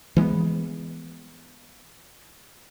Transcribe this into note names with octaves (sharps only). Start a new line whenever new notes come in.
E3 G#3 A#3 B3